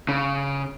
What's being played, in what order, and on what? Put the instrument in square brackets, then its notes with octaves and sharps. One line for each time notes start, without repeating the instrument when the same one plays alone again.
[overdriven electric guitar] C#3